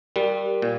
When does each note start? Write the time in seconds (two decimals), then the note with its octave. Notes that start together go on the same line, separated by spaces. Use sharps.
0.16 G3 G4 A#4
0.62 A#2